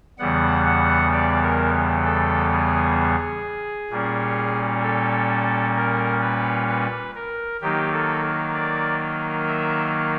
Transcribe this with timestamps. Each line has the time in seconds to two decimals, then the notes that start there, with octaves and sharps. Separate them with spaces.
0.19 E2 C#3 E3 G3 B3 F#5
0.66 F#5
1.12 D5
1.42 A#4
2.05 A4
2.51 G#4
3.90 A#2 G3 A#3 C#4
4.83 A4
5.76 A#4
6.22 B4
6.69 B4
7.15 A#4
7.61 D#3 F#3 A#3 D#4 G4
7.92 A4
8.54 D5
9.47 E5